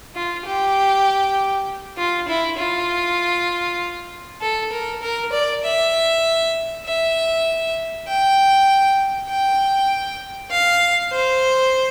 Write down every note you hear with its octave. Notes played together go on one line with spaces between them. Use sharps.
F4
G4
F4
E4
F4
A4
A#4
A#4
D5
E5
E5
G5
G5
F5
C5